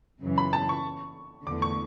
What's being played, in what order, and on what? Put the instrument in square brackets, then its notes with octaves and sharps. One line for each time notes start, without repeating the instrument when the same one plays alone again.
[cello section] F#2 C#3 E3
[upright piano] B5
A5
C#6
[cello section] E2 D3 A3 [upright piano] D6
[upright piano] C#6